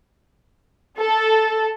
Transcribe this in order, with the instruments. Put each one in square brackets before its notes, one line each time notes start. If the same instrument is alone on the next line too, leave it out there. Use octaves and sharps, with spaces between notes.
[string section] A4